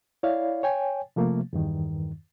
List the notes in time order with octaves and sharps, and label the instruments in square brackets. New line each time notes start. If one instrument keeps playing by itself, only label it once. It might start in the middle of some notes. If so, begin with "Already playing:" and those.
[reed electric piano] E4 C#5 D5 F5
C#5 G5 G#5
C3 F3 A3 A#3
E2 G2 D#3